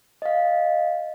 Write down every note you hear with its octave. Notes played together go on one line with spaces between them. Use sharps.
D#5 F5